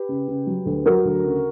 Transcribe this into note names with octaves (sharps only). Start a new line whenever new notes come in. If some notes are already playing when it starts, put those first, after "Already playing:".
Already playing: G4 B4
C#3
C#3
F#3
D2
F#3 F#4 A#4
D2
C#3